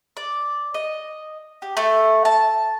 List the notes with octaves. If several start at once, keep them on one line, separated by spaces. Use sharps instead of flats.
D5
D#5
G4
A3
A5